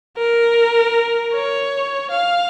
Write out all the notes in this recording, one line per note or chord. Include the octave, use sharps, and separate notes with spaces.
A#4
C#5
F5